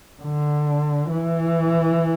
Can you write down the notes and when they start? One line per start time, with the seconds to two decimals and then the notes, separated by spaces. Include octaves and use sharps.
0.22 D3
1.09 E3